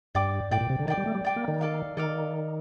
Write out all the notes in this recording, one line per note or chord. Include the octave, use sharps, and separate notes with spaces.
G2 D5 G5 D6
A2 D5 G5 D6
A#2
C3
D3
D#3 D5 G5 D6
G3
A3
G3
D5 G5 D6
A#3
D#3
A4 D5 F5
D#3 A4 D5 F5